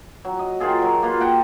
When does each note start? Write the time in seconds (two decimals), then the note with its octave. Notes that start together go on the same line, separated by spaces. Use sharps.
0.25 F#3
0.39 D#5
0.60 D#3 F4 G#4 A4
0.82 F#3 A#4
1.03 A#3 F4 B4
1.20 F#5 G5 A5 A#5